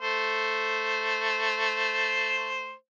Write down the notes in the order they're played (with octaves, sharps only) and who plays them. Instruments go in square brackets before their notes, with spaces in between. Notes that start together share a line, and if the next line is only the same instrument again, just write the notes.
[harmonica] A3 C5